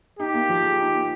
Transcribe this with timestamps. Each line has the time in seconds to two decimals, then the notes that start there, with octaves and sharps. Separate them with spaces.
0.19 D#4 G4
0.34 A#3
0.49 F3
0.64 G#4
0.80 D#4
0.95 A#3